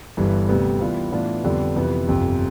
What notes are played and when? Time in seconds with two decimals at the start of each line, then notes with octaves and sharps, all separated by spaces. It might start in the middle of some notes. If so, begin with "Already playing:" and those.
0.17 G1 G2 E3
0.49 D2 C3 G3 B3
0.80 G2 E3 G3 B3 F4
1.12 A2 E3 B3 D4 F4
1.44 F2 D3 G3 B3
1.76 F2 C3 E3 B3
2.08 G1 F2 C3